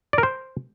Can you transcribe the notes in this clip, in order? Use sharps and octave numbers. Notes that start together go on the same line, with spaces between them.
D5
A#4
C5